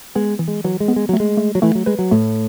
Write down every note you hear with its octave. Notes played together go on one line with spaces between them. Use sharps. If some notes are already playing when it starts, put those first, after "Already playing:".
G#3 B3
E3
G#3
E3 F#3
G#3
B3
G#3
F#3 A3
G#3
A3
F#3
E3 A3
F#3
G#3 B4
F#3
A2 A3